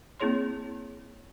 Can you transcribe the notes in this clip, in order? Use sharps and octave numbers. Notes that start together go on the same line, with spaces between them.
A#3 C4 E4 G#4 C#5 C6